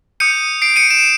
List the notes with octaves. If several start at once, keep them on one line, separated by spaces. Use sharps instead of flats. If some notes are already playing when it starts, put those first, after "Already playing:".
D#6 G6 C#7 D#7
C7 D7
C#7 D#7
D7 E7